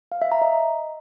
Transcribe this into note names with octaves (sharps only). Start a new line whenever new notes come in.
F5
E5
A#5
D#5